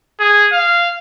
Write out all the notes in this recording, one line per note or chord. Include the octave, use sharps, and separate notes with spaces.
G#4
F5